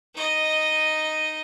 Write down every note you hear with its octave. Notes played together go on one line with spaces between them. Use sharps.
D#4 D#5